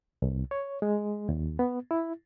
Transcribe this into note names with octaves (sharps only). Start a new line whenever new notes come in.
C2
C#5
G#3
D#2
B3
E4